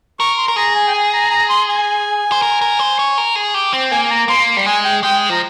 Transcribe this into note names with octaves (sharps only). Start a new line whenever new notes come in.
A#4 C#6
C6
A#4
G#4 A#5
G#5
G5
G#5
A#5
A#5
C6
G#5
C5
A#4
A#4
C5
C#5
A#4
G#4
G4
C4
A#3 G#5
G#5
A#5
A#3 C6
G3
G#3 G#5
G5
G#3 G5
F3 A#5